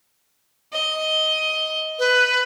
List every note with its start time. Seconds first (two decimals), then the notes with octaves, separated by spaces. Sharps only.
0.72 D#5
1.99 B4